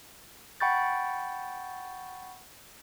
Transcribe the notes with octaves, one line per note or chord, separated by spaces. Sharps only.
F#5 G5 B5 C#6 G6 A6